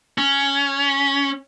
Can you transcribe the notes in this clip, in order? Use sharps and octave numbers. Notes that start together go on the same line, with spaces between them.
C#4